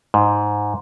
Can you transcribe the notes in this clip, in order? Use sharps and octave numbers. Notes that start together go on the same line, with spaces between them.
G#2